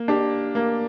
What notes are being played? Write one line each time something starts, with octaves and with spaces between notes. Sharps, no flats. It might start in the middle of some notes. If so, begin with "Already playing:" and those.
Already playing: A#3
D4 G4
A#3